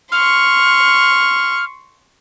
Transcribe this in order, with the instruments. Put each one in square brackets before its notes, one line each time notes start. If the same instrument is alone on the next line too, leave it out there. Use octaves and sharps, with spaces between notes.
[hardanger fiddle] C6 C#6 [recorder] F6